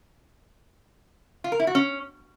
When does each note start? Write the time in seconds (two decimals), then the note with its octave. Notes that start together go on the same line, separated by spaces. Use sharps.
1.44 F4
1.52 A#4
1.60 E4
1.67 F#4
1.75 C#4